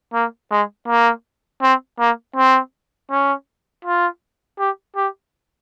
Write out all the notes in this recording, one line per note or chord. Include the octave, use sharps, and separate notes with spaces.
A#3
G#3
A#3
C4
A#3
C4
C#4
F4
G4
G4